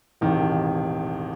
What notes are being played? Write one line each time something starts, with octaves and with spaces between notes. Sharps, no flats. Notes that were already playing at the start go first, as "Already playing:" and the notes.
E1 A1 C3 D#3